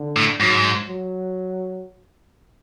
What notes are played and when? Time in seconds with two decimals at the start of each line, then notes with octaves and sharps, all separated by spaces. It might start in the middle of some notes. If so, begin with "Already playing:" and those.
Already playing: D3
0.17 A2
0.40 G#2 F#3
0.88 F#3